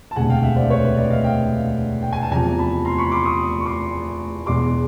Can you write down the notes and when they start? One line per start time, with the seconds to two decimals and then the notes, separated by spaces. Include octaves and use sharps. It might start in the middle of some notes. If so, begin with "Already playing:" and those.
0.11 A5
0.16 E1 D2 C3 F#5 G#5
0.30 F5 G5
0.43 E5 F#5
0.56 C5 D5
0.70 B4 C#5
0.84 B4
0.97 D5 E5
1.10 D#5 F5
1.24 F5 G5
2.02 G5
2.13 G#5
2.22 A5
2.31 E2 C3 F3 G#5 A#5
2.59 A5 B5
2.85 A#5 C6
2.98 B5 C#6
3.12 C6 D6
3.25 C#6 D#6
3.60 C#6
3.66 C6 D6
4.46 E1 E2 B2 G#3 C6 D6